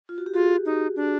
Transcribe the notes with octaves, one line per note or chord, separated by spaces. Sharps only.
F4
F#4
G4
F4 F#4 G#4
D#4
D4